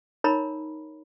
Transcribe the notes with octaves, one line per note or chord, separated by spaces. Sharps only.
D#4 A#4 C#5 A#5 B5